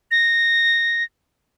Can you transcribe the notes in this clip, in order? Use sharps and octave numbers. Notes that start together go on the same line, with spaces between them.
A#6